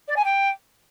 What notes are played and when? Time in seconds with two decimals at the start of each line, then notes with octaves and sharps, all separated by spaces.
0.08 D5
0.16 G#5
0.24 G5